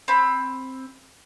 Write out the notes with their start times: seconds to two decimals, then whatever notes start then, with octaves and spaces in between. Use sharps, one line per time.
0.08 C4 B5